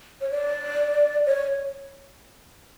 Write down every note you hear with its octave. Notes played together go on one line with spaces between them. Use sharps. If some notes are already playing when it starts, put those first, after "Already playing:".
C#5
D5
C#5